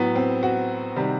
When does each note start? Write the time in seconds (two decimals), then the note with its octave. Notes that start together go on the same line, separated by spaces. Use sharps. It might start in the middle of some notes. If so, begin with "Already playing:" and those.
Already playing: A2 F#3 B3
0.15 C4
0.43 F#4
0.96 C3 D#3 G3